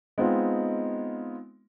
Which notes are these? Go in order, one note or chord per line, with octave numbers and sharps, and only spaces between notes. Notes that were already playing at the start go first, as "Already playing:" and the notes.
G#3 B3 C4 D#4 F4